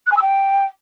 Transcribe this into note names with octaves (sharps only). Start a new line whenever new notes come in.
F#6
G#5
E6
G5